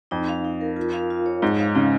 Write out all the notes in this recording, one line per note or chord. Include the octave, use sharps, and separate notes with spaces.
F2 D#4
F5
D#4
A#4
F4
F5
F4
C#5
G#2 D#4
F5
C#3 D#4